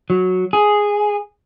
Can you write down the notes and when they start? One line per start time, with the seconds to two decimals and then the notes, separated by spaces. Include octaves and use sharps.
0.10 F#3
0.53 G#4